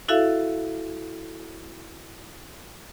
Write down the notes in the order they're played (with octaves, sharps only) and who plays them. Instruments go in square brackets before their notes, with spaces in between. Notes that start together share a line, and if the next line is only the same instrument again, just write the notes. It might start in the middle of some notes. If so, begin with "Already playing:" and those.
[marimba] E4 F#4 A4 E5 F5